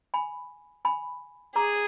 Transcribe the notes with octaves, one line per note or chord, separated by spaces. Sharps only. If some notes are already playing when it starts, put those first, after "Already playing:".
G#5 B5
G#5 B5
G#4 A#5 D6